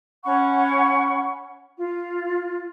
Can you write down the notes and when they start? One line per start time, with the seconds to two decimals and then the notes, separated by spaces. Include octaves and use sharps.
0.23 C#4 F#5 B5 C#6
1.77 F4